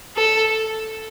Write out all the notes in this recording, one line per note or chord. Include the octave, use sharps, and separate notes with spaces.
A4